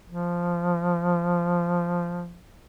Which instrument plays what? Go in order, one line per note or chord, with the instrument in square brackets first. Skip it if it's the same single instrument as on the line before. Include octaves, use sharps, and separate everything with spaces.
[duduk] F3